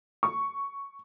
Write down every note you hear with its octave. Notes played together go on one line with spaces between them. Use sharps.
C#6